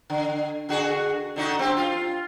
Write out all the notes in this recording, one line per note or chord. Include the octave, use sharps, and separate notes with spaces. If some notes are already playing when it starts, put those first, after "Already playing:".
D3
D3 F#4 G#4
D3 D#4 F#4
C4 G4
F4